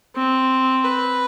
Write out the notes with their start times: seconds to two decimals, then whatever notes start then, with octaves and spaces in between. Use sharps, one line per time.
0.16 C4
0.84 B4